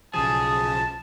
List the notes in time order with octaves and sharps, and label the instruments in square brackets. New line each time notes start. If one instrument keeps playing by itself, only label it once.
[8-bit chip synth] B1 C#3 F3 [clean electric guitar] G#4 [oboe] A5